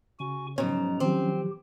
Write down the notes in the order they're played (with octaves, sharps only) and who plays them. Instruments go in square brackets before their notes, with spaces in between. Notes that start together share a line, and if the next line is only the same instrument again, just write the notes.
[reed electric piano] C#3 [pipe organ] F#4 G#5 C#6
[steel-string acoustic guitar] G#2 B2 [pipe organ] F3 F#3 A#5 [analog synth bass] C#4
[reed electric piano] D#3 F3 F#3 [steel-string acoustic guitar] C4 [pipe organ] G4